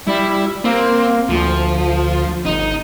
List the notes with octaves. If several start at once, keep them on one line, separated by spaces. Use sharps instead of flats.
G3 E4
A#3 C4
D2 F3
G1 D#4